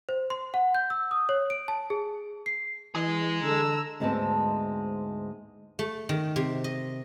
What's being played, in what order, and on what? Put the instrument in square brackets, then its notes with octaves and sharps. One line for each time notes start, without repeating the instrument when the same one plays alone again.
[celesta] C5
C6
F#5
G6
E6
D#6
C#5
D7
A5
G#4
C7
[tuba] E3 [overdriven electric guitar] G#4 D#5
[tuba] D3 [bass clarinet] A4 [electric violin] A#5 E6
[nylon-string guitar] D2 G#2 G#3 B3 C4 A5
[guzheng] A3
D#3
C3
D#5